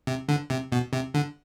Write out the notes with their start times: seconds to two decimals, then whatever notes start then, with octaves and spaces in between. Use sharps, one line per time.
0.07 C3
0.29 D3
0.50 C3
0.72 B2
0.93 C3
1.14 D3